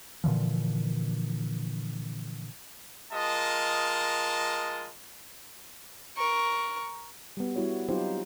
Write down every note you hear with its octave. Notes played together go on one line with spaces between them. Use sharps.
A#2 D3 E3 F3
G#3 F4 A#4 D#5 A5
A#4 C#6
G3 B3
G3 E4 F#4 C#5
F#3 C4 D#4 F4 G4 C5